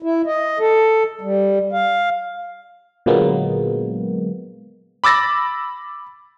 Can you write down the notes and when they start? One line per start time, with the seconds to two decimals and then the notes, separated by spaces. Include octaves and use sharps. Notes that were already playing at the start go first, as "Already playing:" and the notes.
0.02 E4
0.26 D#5
0.59 A4
1.21 G3
1.73 F5
3.06 A#2 D3 F#3 G#3 A#3 B3
5.04 B5 D6 E6 A6 A#6